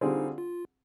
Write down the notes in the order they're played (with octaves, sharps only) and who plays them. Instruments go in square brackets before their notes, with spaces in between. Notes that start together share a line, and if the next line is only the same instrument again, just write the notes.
[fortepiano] D3 G3 C4 F4 G#4 [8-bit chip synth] D#4
[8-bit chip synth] F4